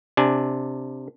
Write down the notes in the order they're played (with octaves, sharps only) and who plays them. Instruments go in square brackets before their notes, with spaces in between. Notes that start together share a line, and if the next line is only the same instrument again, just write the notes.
[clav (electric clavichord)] C3 D4 G#5